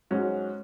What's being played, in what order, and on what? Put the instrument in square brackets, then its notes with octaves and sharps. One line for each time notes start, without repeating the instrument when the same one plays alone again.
[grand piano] G#2 F#3 C#4 F#4 [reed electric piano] G#3